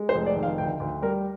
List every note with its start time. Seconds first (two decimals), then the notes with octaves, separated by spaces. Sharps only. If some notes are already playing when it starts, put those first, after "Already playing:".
Already playing: G#3
0.09 C5
0.15 F1
0.26 D5
0.36 D#3
0.43 F5
0.58 D2 G5
0.80 D2
1.02 G3 A#4